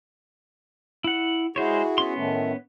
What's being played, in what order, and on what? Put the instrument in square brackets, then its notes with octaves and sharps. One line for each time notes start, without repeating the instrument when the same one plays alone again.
[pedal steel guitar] E4 F#5
[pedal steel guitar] G#3 C5 C#5 [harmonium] E4 F#4 G#4
[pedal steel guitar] B3 C#4 C6
[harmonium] A2 D#3 A3